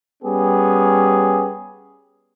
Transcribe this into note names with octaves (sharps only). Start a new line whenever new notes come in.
G3 B3 C#4 G4 G#4